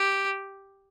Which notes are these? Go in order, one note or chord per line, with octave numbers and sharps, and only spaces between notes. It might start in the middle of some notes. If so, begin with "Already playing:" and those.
Already playing: G4